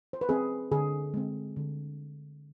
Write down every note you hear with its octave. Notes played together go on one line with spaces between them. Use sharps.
C5
B4
C4 G#4
D3 G#4
G#3 C4
D3